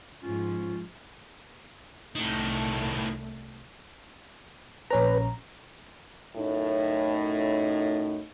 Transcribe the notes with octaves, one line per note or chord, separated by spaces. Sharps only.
G#2 F3 C#4 F4
C2 A2 D#3 A3
A#1 C#4 B4 A#5
F#2 A2 D#4